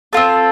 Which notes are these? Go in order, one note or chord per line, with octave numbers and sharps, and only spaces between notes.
C4 F4 A4